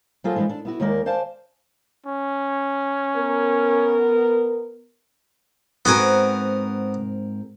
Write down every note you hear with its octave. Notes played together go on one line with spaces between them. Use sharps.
F#3 A#3 F4 G#4 A4 C5
E3 F3 G#3 C#4 D4
D4 A4
B3 E4 F#4
D#2 D#3 G#3 A#3 A#4 D5
C5 D5 F5 G#5 A5
C#4
B3 A#4
G#2 B3 C4 F#4 A#4 G#5